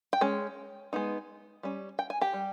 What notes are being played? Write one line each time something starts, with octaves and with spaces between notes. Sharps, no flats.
G5
G#3 C#4
G#3 B3 D#4
G3 C#4
G5
G#5
G4 G5
G3